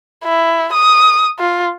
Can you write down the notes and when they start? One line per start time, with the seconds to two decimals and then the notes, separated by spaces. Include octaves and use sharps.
0.24 E4
0.73 D#6
1.39 F4